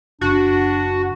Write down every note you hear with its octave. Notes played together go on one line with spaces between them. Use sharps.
F#1 D4 F#4